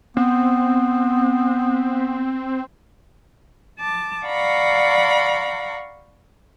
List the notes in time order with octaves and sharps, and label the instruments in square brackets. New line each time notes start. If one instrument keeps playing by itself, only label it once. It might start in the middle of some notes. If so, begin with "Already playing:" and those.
[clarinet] B3 [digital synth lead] C4
[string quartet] A5 D6
D5 F5 F#5 A#5 B5 C#6